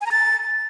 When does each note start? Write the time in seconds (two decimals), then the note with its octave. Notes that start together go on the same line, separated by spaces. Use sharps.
0.01 G#5
0.06 A#5
0.11 A6